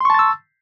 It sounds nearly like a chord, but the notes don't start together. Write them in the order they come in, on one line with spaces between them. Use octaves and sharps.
C6 C#6 A5 A6 E6